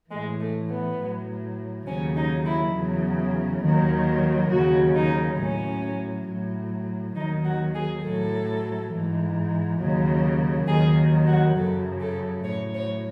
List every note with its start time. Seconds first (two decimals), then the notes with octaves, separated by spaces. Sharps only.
0.10 A2 E3 G#3
0.40 A3
0.69 B3
0.99 A2 F#3
1.87 D#2 C#3 F#3 C#4
2.16 D#4
2.45 E4
2.75 E2 C#3 F#3
3.62 D#2 D#3 F#3
4.51 D#2 C#3 F#3 F#4
4.95 D#4
5.39 A2 F#3 C#4
6.28 A2 F#3
7.15 D#2 D#3 F#3 D#4
7.45 F#4
7.74 G#4
8.03 A2 F#3 A4
8.92 G#2 E3
9.79 D#2 C#3 F#3
10.67 D#2 D#3 F#3 G#4
11.27 F#4
11.56 F#2 C#3 F#3 A4
12.01 A4
12.44 A2 F#3 C#5
12.74 C#5